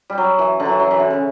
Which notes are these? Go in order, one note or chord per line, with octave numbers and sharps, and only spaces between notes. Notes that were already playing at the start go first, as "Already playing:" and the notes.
G3
F#3
E3
D3
E3 F#3
F#3
E3
D3
C#3